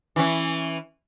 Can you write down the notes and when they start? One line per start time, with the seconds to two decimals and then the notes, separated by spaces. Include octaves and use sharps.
0.16 E3 C#4